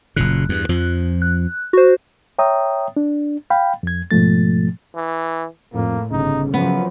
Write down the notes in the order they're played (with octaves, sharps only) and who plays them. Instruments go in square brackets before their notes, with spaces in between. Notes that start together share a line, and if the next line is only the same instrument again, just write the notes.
[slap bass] F#1 A#2 C#3 [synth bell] F#6
[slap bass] E2 G2
F2 F3
[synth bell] F#6
F#4 C5
[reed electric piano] C#5 E5 G5 A#5 D#6
D4
F5 G5 B5
F2 G#6
G#2 B2 F3 A3 A6
[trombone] E3
[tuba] F2 [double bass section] A2 [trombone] A#3
[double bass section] G1 [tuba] C#3 [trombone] D#4
[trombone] F#2 [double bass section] F3 F#3 [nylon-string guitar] B3